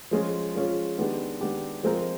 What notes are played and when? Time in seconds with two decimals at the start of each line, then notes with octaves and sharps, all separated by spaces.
0.11 F3 G#3 C#4 F4 G#4
0.55 F3 G#3 C#4 F4 G#4
0.98 D#3 G#3 B3 D4 G4
1.40 D#3 G#3 B3 D4 G4
1.83 F3 G#3 C4 F4 A#4